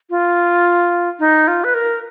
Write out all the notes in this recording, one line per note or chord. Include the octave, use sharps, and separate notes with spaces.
F4
D#4
F4
B4
A#4